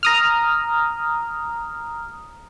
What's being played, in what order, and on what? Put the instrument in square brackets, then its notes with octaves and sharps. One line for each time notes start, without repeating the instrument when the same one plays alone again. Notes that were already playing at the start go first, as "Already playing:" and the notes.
[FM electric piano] A#5 D#6 F6